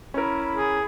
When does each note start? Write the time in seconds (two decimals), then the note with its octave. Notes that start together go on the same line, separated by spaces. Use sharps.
0.14 C#4 E4 A#4 B5
0.54 G#4